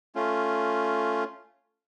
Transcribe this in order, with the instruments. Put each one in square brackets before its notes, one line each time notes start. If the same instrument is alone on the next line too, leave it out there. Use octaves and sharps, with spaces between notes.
[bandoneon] A3 C#4 F4